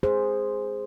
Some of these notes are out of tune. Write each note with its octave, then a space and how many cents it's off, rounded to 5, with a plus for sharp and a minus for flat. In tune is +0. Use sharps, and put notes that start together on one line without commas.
G#4 -10 C5 +0